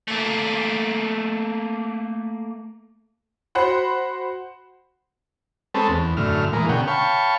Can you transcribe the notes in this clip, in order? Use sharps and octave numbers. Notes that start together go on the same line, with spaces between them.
A3 A#3
F#4 C5 F#5 B5
G#3 C4 C#4 A4 B4 A5
E2
F#2 A2 D3 F6
A#2 E3 G#3 A#4
B2 D3 C#4 F#5 G5
C#5 F5 G5 A5 B5 C#6